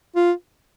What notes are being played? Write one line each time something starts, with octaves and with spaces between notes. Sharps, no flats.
F4